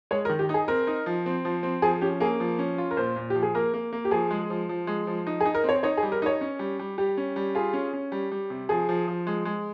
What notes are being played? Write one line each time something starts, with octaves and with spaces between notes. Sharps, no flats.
G#3 C#5
A#4
D#3
G4
D#4
G#4
C4 A#4
D#4
F3
C4
F3
C4
F3 G#4
C#4 G4
A#3 G#4
F3
C#4
F4
A#4
A#2 C5
A#2
F3 G4
G#4
A#3 A#4
A#3
A#3
G4
F3 G#4
G#3
F3
F3
G#3
F3
D#4
G#4
D#4
A#4
C4
C#5
D#4 C#5
G#4
G3
A#4
D#4 C#5
C#4
G3
G3
G3 G4
C#4
G3
F4 G#4
C#4
C#4
G3
G3
C3
F3 G#4
F3
F3
G#3
G#3